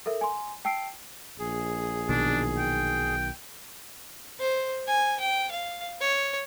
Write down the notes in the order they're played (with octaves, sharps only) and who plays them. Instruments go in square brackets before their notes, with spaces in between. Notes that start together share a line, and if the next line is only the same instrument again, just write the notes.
[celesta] A4 A#4 E5
G#5 C6
G5 A5 E6 C7 D7
[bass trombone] A#1 [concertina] G#4
[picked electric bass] B1 B2 D#3 [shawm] D4
[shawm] G5
[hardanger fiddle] C5
G#5
G5
F5
C#5